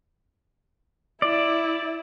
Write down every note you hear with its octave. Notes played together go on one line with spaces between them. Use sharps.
E4 D5